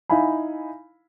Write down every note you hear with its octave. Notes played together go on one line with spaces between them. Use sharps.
D#4 E4 F5 G#5 B5